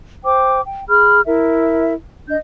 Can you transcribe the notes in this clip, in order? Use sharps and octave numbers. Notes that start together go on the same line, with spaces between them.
C5 G5 D6
G5
G#4 B5 F6
E4 A#4 E5
D4 D#5 G6